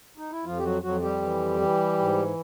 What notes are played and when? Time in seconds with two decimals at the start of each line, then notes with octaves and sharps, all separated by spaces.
0.17 D#4
0.31 E4
0.45 F2 F3 F4
0.58 G4
0.64 F#3 F#4
0.83 F2 F#3 F#4
1.02 G3 G4
1.22 E3
1.60 E3
1.99 G#2